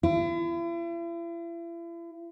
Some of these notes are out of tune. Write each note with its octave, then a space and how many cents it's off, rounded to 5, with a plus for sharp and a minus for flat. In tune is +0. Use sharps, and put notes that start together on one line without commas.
E4 +40